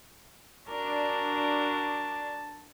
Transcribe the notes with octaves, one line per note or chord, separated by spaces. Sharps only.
D4 F#4 A#4 A5